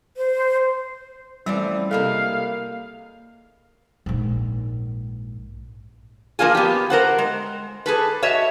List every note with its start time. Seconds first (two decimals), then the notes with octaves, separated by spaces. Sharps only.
0.17 C5
1.46 E3 F3 G3 A3 C4 C#4 D5
1.91 C3 G#3 A#3 E4 A4 F5
4.06 A#1 G#2
6.39 F3 A#3 D4 F4 G#4
6.55 B3 G4
6.90 A#4 C5 F#5
7.18 G#3
7.86 G#4 A4 B4
8.22 F#4 C#5 D#5 E5